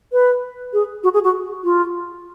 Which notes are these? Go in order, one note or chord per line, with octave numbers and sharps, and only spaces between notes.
B4
G#4
F#4
G#4
F#4
F4